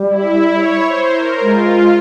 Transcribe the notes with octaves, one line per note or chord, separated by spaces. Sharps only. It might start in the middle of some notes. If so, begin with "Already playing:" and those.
Already playing: G3
E4
C#5
C5
A#4
G#3 F4